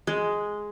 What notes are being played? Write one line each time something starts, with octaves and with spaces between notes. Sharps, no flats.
G#3